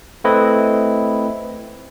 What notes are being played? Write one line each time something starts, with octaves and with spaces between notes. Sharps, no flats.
A3 C4 E4 B4 D#5